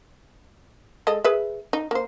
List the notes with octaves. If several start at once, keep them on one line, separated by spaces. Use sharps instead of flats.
G#3 A4 D#5
G#4 B4 E5
D#4
A#3 C5